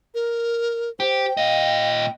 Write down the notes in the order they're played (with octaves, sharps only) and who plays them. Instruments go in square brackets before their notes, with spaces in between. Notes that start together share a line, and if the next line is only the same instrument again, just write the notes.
[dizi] A#4
[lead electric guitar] G4 [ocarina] C5 [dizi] G5
[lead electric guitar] A#2 D#5 [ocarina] F5